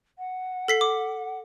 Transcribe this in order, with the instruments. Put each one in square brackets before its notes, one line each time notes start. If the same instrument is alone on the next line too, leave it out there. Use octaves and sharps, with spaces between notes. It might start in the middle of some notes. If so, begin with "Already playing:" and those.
[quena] F#5
[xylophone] A4 B6 C7
D6